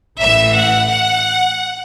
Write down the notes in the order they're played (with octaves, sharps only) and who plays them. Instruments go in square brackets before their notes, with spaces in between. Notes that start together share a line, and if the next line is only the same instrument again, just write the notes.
[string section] A1 A2 E3 E5
F#5
F#5